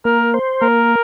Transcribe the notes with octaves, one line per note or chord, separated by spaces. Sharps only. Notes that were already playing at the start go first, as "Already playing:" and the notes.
A#3 A#4
C5
A#3 A#4